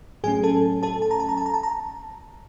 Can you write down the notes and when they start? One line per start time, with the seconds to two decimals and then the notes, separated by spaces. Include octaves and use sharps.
0.24 A2 F#3 A3 C#4 G#4 G#5
0.44 A4 A5
0.83 A4 A5
1.02 A5
1.11 A#5
1.20 A5
1.29 A#5
1.37 A5
1.46 A#5
1.54 A5
1.63 A#5